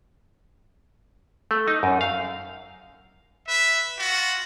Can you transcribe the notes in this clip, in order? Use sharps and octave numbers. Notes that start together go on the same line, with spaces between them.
A3
D#4
F#2
F5
B4 E5
F4 F#4